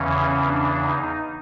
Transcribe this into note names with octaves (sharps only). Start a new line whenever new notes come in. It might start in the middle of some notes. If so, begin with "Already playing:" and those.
Already playing: E2 C#3 E3 C#4
D4
D#4